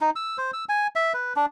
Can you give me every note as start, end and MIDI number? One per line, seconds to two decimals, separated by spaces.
0.01 0.10 63
0.16 0.37 88
0.38 0.51 72
0.53 0.65 88
0.69 0.87 80
0.96 1.13 76
1.14 1.33 71
1.36 1.46 62